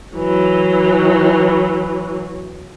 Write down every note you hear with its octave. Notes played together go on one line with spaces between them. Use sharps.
E3 F#3